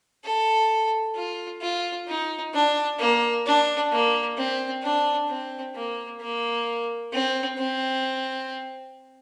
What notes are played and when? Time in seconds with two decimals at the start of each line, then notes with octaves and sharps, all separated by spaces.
0.24 A4
1.16 F4
1.61 F4
2.07 D#4
2.53 D4
2.99 A#3
3.46 D4
3.92 A#3
4.37 C4
4.82 D4
5.29 C4
5.75 A#3
6.21 A#3
7.13 C4
7.58 C4